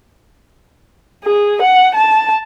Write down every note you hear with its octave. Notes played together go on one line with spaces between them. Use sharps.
G#4
F#5
A5